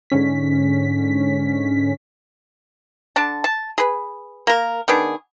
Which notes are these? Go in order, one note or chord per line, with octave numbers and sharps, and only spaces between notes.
G#2 D3 C#4 B6
D3 D4 A5
A5
G#4 B4
A#3 A#4
D#3 B3 D4 G#4